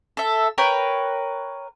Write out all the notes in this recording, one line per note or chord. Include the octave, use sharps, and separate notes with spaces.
A4 E5
A#4 B4 C#5 G5